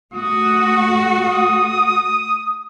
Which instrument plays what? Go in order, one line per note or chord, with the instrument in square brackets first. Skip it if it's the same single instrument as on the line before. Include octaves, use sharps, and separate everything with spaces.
[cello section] A3 F#4 [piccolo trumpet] D#6
[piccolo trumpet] D#6